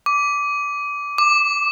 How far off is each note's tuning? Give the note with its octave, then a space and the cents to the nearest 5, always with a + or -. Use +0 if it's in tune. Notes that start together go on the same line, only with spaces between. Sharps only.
D6 -15
D6 +15